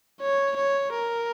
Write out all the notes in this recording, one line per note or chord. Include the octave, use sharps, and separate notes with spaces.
C#5
C#5
A#4